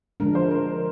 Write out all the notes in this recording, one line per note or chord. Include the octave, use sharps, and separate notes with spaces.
D3 F3 G#3 D4 A#4
C5
A#4